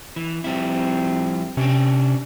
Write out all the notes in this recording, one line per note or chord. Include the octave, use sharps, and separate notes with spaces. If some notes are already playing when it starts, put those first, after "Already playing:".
E3
F3 G3 C4 E4
C3 C#4 D4 G5